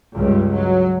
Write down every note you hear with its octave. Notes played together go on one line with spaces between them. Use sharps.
C#2 G2 G3 G#3
F#3